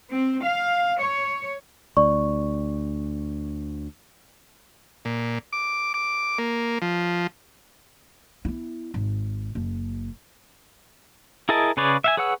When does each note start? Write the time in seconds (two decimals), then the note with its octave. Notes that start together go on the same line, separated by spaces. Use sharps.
0.12 C4
0.45 F5
1.00 C#5
1.97 D2 D5 C#6
5.05 A#2
5.53 D6
5.94 D6
6.39 A#3
6.82 F3
8.45 B3 E4
8.94 G#1
9.55 F#1
11.49 E4 G#4 A#4 D#5 A5
11.77 C#3 G#4 B4 C#5 D5
12.04 E5 F5 G#5
12.17 G#4 B4 C#5 F#5 E6